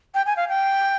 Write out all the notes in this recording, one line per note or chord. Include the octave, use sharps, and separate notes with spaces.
G5
G#5
F5
G5